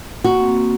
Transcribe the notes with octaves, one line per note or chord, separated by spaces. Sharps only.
A#3 F#4
C4
A#3